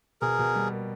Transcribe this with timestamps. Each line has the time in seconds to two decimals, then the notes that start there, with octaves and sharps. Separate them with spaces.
0.21 B2 G#4 A#4
0.39 B2
0.55 G3
0.72 A#3